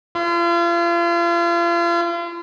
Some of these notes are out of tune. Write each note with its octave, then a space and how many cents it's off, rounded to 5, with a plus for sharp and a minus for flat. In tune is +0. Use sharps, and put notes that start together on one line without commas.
F4 -35